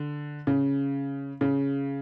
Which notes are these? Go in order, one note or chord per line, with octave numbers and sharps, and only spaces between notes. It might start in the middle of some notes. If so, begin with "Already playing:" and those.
Already playing: D3
C#3
C#3